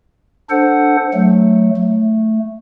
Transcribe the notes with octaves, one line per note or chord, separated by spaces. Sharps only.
D4 A4 C5 F#5
F#3 A3
A3